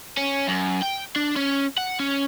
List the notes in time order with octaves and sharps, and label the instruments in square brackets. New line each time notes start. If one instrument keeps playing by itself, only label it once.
[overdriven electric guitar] C#4
F#2
G5
D4
C#4
F#5
C#4